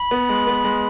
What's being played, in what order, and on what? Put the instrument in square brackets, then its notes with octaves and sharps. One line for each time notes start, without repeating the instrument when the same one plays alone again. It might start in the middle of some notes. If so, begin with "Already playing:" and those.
Already playing: [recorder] B5
[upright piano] B3
G#3
B3
G#3